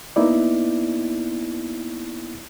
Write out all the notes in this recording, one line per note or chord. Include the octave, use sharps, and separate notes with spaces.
A#3 B3 D#4 E4 D5